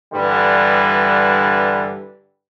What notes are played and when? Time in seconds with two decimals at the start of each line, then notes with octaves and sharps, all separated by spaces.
0.14 G2 D3 E3 G3